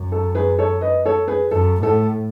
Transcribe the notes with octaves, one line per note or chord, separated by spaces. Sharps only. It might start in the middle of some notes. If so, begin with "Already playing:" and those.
Already playing: F#2
A4
G#4 B4
A4 C#5
B4 D#5
A4 C#5
G#4 B4
F#2 A4
A2 A4